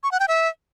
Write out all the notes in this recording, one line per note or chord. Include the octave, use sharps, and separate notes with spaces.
C#6
F#5
G5
E5